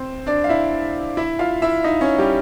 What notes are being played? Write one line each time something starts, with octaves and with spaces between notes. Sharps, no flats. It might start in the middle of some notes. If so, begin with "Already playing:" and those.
Already playing: C4 C5
D4 D5
F5
E4 E5
E4 E5
F4 F5
E4 E5
D#4 D#5
C#4 C#5
G3 G4